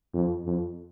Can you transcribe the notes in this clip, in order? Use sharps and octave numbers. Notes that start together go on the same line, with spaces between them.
F2
F2